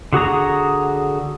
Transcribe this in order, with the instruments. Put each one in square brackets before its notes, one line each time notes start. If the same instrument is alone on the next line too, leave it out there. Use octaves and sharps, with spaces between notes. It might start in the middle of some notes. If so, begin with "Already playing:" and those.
[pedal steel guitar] D3 F#4 G#4 A#5